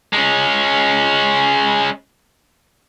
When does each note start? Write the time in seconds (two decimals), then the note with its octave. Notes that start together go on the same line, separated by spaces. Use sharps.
0.13 G#3 C#4